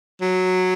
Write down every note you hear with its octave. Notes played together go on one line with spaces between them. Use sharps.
F#3